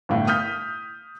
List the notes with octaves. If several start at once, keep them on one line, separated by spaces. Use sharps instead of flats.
G1 A2
D#6 F6 G6 B6